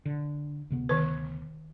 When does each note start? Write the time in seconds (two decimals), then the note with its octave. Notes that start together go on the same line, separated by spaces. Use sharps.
0.06 D3
0.70 D2 C3 B3
0.89 D#3 B4